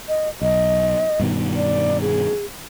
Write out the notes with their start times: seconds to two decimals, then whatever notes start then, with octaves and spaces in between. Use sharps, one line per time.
0.08 D#5
0.41 B1 D#5
1.20 G2 B2 D#3
1.56 D5
2.01 G#4